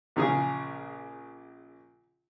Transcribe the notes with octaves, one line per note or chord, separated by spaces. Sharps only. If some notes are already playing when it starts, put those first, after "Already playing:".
A#1 C#3 G#4